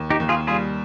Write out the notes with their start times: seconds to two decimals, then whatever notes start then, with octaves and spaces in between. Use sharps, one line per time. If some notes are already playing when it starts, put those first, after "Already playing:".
Already playing: D#2
0.10 D#4 G4
0.20 D#2
0.29 F4 G#4
0.47 G3 F4 G#4